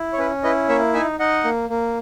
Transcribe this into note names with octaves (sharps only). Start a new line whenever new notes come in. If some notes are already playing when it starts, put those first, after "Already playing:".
Already playing: E4
C#5
C#4 B4
E4 B4 D#5
A#3 C#5 E5
D#4 E5 G#5
D#4 D#5 F#5
A#3
A#3